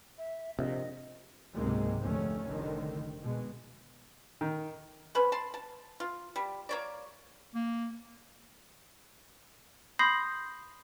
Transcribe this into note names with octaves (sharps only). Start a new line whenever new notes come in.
E5
A#1 C3 D#5
C#2 G#2 C3 F#3 G#3 A#3
F1 D2 A3 C#4
F1 C2 D3 D#3
B2 G#3
D#3
C#4 B4 C5
A5 C6
A5
F4
G3
A#3 C#5 D5
A#3
B5 C6 D#6 G6 A#6 C7